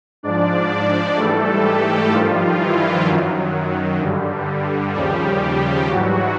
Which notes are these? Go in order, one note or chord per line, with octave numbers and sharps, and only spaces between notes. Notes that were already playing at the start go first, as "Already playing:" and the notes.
G#2 F3 D4 D5
D4 D5
G#2 E3 G3 A3 A4
G3 G4
G2 D#3 F3 G3 F4
E3 E4
F#2 D#3 F#3
G2 D3 G3
D#2 C#3 F3 G3 G4
G#2 E3 F#3 G3 F#4